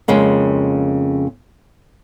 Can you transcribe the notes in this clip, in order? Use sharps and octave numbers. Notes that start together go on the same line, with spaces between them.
F2 C#3 G#3 A#3